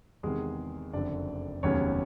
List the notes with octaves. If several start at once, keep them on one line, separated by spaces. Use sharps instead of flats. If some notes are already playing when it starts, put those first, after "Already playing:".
E2 C3 D#3 G#3 G#4
F#1 F2 D3 D4 D5
F1 D#2 C#3 F#3 B3 C#4 C#5